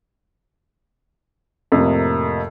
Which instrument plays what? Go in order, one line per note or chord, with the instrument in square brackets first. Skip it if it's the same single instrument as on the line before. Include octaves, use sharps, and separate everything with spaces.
[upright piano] F2 A2 C3 A#3